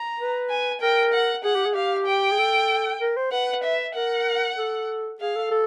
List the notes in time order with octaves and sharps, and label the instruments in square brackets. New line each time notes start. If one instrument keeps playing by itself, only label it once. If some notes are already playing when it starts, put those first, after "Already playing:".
Already playing: [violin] A#5
[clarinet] B4
[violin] G#5
[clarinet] A#4 [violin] G5
[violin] F#5
[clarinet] G#4 [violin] F#5
[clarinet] G4
G#4
[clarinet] G4 [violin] F5
[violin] G5
[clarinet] G#4
A4
A#4
C5
[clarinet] B4 [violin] F#5
[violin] E5
[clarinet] A#4 [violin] F#5
[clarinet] A4
[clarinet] G#4 [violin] F5
[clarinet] A4
A4